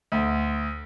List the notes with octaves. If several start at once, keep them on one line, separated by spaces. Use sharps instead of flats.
D2